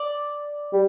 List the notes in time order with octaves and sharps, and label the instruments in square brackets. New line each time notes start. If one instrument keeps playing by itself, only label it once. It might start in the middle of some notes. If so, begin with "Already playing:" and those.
Already playing: [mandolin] D5
[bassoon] G3